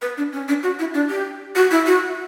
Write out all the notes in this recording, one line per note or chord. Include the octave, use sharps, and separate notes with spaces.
B4
D4
C#4
D4
F#4
E4
D4
G4
F#4
E4
F#4